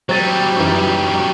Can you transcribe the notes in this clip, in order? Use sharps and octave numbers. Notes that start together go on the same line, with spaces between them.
F#3 G3 C4 A6 D#7
F#2 E3 D#4